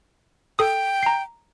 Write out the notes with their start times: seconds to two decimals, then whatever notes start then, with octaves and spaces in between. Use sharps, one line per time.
0.59 A4 G5 D#6
1.03 A#5 C7